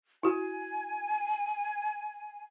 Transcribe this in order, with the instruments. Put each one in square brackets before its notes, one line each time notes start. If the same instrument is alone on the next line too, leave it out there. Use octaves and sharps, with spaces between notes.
[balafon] E4 F#4 [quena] G#5